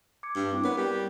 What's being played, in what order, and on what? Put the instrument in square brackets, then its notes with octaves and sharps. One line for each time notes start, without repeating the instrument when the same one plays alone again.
[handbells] D6 G#6 C#7
[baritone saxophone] G2
[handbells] C4 E4 D6
[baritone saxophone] B3 [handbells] A#4 C#5 F#6
[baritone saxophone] G3